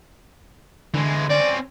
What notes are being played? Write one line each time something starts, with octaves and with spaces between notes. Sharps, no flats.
D3 E3 G#3
C4 C#4 D5